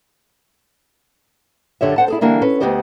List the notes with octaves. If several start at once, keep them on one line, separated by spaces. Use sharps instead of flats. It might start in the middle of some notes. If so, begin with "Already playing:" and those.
F#2 D3 G4 C#5 E5
C5 F#5 A5
E4 G#4 A4
D3 E3 G3 A#3 D4 E4
C#4 A4 B4
D2 G#2 B3 G4 C5 D#5